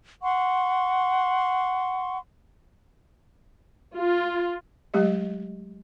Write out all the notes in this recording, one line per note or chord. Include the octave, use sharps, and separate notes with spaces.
F#5 C6 C#6
F4
F#3 G#3 A3 G4 D#5